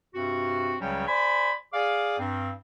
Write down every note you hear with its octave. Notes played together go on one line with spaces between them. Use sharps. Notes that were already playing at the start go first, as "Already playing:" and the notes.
G2 C3 C4 F#4
C#2 C#3 F#3 G3 C#4 G5
C5 D5 G#5 B5
G#4 D5 F5
G2 C4